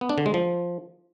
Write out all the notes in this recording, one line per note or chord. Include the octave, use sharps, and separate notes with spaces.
B3
D4
D3
G#3
F3